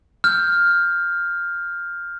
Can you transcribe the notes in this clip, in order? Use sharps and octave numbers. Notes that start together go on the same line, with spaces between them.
F6 G6